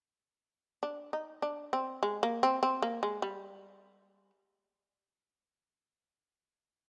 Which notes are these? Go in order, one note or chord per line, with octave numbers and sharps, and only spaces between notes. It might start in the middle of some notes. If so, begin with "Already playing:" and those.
D4
D#4
D4
C4
G#3
A#3
C4
C4
A#3
G#3
G3